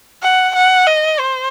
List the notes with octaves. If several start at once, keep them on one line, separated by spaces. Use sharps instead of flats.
F#5
F#5
D#5
C5